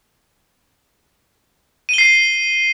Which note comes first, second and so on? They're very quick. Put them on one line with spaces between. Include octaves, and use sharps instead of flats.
D#7 G7 C7